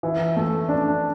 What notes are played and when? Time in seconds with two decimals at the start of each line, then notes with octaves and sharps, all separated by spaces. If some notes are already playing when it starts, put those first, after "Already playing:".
0.03 E3
0.37 A3
0.69 D4